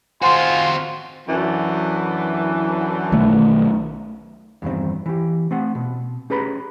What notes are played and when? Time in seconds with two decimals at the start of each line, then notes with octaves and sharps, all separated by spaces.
0.22 C4 F4 F#4 C5 G#5 C6
1.27 F#2 D3 E3
3.12 B1 D#3 A3
4.62 E2 G2 D#3 C4
5.06 E3 G4
5.51 A3 C4 F#5
5.75 B2
6.30 C#4 G4 G#4 B4 A#5 B5